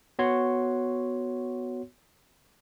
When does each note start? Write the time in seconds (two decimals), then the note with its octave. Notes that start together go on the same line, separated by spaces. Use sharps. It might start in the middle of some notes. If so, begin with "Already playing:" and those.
0.19 B3 F#4 C#5 C6